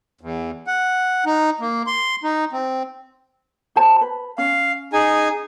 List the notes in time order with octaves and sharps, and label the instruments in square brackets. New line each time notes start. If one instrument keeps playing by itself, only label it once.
[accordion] E2
F#5
D#4
A#3
C6
D#4
C4
[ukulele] F#4 C5 A5
B4
[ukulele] C#4 [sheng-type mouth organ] F5
[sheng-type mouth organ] D#4 G#4 G#5